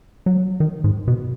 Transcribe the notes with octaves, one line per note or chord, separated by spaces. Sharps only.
F#3
D#3
G#2
B2